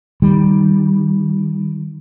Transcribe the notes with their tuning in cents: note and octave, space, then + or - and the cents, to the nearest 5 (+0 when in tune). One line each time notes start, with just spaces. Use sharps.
D#3 +0 G3 +0